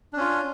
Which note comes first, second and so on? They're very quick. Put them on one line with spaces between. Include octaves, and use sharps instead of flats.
D4 C#4 F4